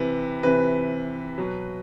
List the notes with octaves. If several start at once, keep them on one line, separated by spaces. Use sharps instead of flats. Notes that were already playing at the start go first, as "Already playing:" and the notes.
Already playing: C3 E3 B4
C3 E3 B4
B2 F#3